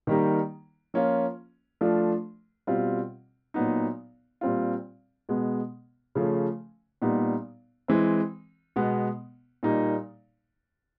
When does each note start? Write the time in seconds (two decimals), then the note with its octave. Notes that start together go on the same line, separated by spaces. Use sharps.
0.07 D#3 G3 A#3 D#4
0.94 F3 A#3 C#4 F4
1.81 F3 A3 D4 F4
2.67 B2 G3 C4 F4
3.54 A#2 F#3 B3 D#4
4.41 A#2 G3 C4 F4
5.29 B2 G#3 B3
6.15 C#3 F3 A3 C#4
7.02 A#2 G3 B3 D#4
7.88 E3 G#3 C4
8.76 B2 G#3 B3
9.63 A#2 G3 A#3 D#4